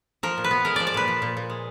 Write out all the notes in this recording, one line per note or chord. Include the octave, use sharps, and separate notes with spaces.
F3 A#4
A#2
B4
B3
G#3 A#4
F3 D5
D5
A#2 B4
F3
A#2
A#2
G#3